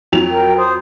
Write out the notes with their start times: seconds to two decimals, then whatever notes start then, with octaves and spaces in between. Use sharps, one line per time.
0.12 F2 F#3 F7
0.30 A#4 G5
0.57 C5 D#6